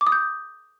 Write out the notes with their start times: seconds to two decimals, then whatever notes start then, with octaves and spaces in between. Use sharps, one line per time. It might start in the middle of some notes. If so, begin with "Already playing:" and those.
0.01 D6
0.07 D#6
0.12 G6